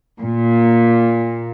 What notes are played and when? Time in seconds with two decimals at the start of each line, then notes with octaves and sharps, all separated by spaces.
0.19 A#2